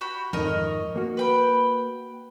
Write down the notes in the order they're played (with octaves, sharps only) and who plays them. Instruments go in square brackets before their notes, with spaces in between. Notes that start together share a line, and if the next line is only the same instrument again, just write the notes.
[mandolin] F#4 G4 B5
[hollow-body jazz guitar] F2 G#2 D#3 [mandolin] A#4 C#5 D#5
[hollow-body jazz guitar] A#3 F#4
[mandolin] B4 G5 B5